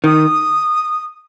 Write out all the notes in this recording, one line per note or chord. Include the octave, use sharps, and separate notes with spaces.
D#3 D#6